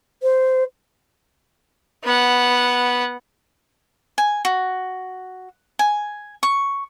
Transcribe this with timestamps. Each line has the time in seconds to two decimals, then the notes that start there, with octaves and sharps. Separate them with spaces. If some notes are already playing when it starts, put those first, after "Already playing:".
0.23 C5
2.04 B3 F#5
4.18 G#5
4.45 F#4
5.79 G#5
6.43 C#6